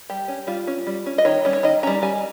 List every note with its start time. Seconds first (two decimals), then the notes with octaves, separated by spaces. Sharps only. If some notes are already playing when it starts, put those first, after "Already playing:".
0.10 G3 G4
0.28 C#4
0.47 G3 F4
0.67 C#4
0.87 G3
1.06 C#4
1.18 D#5
1.25 D#3 C#5
1.45 G3 C#4
1.53 C#5
1.63 D#3 D#5
1.83 G3 C#4 A#5
2.02 G3 G#5